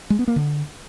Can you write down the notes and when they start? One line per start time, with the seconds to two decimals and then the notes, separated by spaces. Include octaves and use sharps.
0.10 G#3
0.19 B3
0.28 A#3
0.36 D3